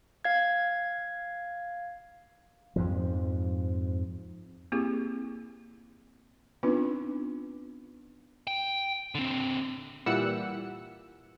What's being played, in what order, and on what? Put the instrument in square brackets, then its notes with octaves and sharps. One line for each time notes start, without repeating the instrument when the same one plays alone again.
[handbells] F5 G#6
[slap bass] F2 G#2 F3
[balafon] A#3 C4 E4 G4 G#4
B3 C4 D4 D#4 F4 B4
[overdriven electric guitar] G5
D3 C4
[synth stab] A#2 E3 G3 F#5 E6 C#7